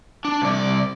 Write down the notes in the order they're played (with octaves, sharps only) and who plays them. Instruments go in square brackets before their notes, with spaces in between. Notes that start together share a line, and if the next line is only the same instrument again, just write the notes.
[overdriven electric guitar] D4
C2 D5